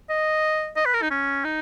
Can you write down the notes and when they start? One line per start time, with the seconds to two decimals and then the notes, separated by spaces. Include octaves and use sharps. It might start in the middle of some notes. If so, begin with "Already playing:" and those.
0.10 D#5
0.76 D#5
0.86 B4
0.94 A#4
1.02 D#4
1.11 C#4
1.45 D#4